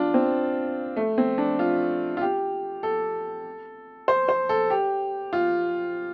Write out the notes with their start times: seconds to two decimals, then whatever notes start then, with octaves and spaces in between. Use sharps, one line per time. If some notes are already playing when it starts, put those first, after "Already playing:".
Already playing: D4 F4
0.14 C4
0.96 A3
1.18 C4
1.38 D4
1.59 F4
2.17 F4
2.21 G4
2.83 A4
4.08 C5
4.29 C5
4.49 A4
4.70 G4
5.33 F4